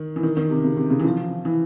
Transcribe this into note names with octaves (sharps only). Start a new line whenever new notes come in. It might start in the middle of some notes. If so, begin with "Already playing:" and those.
Already playing: D#3
E3
D#3
D#3
C3
C#3
C3
C#3
E3
F3
E3